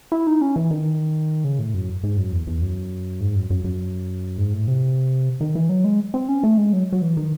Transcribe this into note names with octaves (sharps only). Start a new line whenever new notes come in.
E4
D#4
C#4
E3
D#3
C#3
A2
F#2
G#2
F#2
E2
E2
F#2
G#2
F#2
F#2
F#2
G#2
A2
C3
D#3
E3
F#3
G#3
C4
C#4
A3
G#3
F#3
F#3
E3
D#3